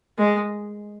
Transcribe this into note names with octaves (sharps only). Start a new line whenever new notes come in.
G#3